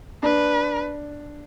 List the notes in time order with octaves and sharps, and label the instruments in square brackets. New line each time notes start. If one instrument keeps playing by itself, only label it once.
[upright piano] D4 [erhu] B4